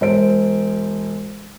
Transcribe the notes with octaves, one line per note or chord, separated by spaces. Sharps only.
E1 C5 D7